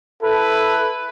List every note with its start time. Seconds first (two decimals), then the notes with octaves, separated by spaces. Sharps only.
0.22 E4 A4 B4